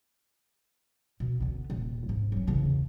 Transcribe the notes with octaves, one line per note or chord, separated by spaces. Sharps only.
B2
D3 B3
D#1
G#2
F#3 C#4
E2 C#3